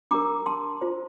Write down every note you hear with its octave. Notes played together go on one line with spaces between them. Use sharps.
D4 G4 A#4 A#5 D6
A5 C6
F4 C5